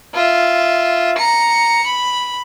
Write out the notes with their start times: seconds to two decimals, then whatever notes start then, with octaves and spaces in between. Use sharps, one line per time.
0.15 F4 E5
1.18 A#5 C#7
1.86 B5